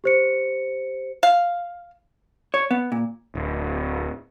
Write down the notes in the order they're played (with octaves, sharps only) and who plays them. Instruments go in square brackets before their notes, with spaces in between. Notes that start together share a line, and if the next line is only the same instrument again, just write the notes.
[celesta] G4 C5 C#7
[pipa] F5
[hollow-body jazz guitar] C#5
B3
A#2
[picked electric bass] D1